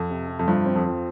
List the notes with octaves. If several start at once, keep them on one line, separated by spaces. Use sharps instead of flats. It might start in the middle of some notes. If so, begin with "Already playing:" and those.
Already playing: F2
C3
C3
F2
G2 F3
C4
F2
F3